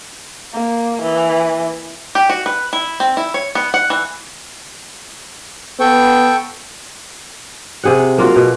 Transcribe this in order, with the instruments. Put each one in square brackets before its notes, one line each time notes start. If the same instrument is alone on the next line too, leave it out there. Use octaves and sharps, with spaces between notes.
[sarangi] A#3
E3
[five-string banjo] G4
F#4
B4
E4
C4
E4
C#5
B3
F#5
E3
[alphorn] B3 [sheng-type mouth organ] A4 G5 C#6
[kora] C3 G#4 F#5
A#3 F4 F#4
B2